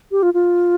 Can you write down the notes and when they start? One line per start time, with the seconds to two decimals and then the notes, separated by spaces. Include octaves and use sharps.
0.11 G4
0.23 F4
0.34 F4